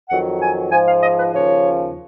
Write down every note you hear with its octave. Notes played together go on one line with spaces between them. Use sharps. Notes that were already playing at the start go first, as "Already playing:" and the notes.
F2 D#3 F#3 F#5
G#5
G#2 F3 G#5
F5
D#5
B4
D#2 C#3 F3 C#5